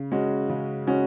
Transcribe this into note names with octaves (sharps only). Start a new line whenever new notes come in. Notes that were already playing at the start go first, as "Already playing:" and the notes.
Already playing: C#3
G#3 C#4 F#4
C#3
G#3 C#4 F#4